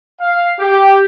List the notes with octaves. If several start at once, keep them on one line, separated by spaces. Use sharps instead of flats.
F5
G4